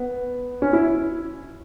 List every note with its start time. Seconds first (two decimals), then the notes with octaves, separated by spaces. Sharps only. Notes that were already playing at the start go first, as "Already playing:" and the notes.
Already playing: B3
0.62 C#4
0.73 E4